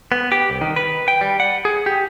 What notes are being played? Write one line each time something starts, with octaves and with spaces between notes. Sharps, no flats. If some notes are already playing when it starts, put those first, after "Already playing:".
B3
G4
C2
D#3
B4
G5
G3
F#5
G#4
G4